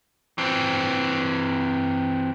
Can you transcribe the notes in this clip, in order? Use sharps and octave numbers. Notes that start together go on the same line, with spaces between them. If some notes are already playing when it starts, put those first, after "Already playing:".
E3 C4